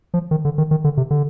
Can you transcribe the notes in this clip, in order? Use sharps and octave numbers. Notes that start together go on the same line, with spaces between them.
F3
D#3
D3
D#3
D#3
D3
C3
D3